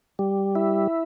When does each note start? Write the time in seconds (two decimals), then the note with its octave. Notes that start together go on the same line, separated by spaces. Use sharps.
0.19 G3
0.55 E4